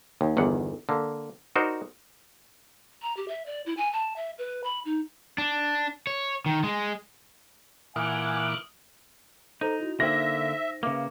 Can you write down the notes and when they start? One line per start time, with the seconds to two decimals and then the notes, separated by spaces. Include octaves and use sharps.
0.21 D#2
0.37 G1 E2 D#3 F#5
0.89 D3 A#3
1.56 D#4 F#4 A#4 C5 D5 D#5
3.02 A#5
3.17 G4
3.28 E5
3.46 D5
3.66 E4
3.77 G#5
3.93 A5
4.16 E5
4.38 B4
4.64 B5
4.85 D#4
5.38 D4
6.07 C#5
6.46 D#3
6.64 G#3
7.96 A#2 E3 F#5 G#5 D6 D#6 F6 F#6
9.61 D#4 A4 C5 A#5
9.80 E4 F#4
10.00 D3 A#3 D#4 C5 E5 G5 A#6
10.83 C#3 A#3 B4 E5 D6